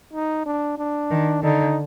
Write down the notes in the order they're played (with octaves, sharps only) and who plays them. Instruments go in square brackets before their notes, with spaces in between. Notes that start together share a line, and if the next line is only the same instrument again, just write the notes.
[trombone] D#4
D4
D4
[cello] D#3
[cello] D3 [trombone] D#4